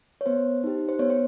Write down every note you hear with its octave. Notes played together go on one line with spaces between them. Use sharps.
C#5
B3 C5
D#4 G4
C5
B3 C#5
C5